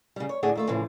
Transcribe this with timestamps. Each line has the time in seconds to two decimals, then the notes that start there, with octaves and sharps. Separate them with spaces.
0.16 C#3 G3
0.29 C#5
0.43 D2 A2 D4 G#4 F#5
0.55 D#2 A3 F4
0.68 A2 C#3 E3 F3